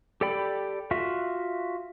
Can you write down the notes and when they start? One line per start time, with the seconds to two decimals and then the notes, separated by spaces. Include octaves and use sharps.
0.21 G4 A4 D5 G5 B5
0.91 F4 F#4 E5